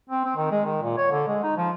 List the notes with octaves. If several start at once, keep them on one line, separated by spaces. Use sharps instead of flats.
C4
C4
D#3
G#3
D#3
A#2
C#5
D3
G#3
D#4
F3